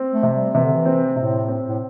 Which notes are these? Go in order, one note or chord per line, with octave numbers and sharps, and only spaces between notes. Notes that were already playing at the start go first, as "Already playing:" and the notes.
Already playing: C4
A3
C3
G3
C3 E3
D3
E3
C4
A2 C3
C4
A2